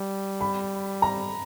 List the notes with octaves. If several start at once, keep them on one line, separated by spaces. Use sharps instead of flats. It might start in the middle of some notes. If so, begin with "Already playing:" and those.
Already playing: G3
B5
A#5